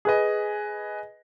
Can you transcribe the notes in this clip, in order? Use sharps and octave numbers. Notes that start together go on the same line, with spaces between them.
G#4 B4 D#5